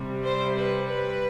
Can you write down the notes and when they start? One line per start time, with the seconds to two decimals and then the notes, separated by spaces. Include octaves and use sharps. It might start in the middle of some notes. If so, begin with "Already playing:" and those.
Already playing: C3 G3
0.24 C5
0.57 B4
0.89 B4